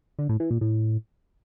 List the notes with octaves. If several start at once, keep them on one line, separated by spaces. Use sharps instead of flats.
D3
A2
E3
A#2
A2